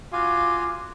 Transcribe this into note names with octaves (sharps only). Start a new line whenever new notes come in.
F4 F#4 F5 G#5 D6